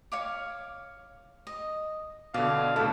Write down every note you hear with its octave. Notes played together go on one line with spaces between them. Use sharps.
C#5 F5 D6
D#5
B2 D3 D5 F5
A2 C#3 D4 E4 A4 A#5